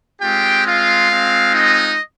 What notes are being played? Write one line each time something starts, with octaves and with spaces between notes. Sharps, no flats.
G#3 C4 F4 G4 G5
F4 F5
G#3 C4 F4
D#4 D#5